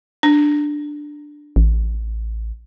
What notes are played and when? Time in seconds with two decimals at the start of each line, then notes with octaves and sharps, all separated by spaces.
0.23 D4
1.56 A1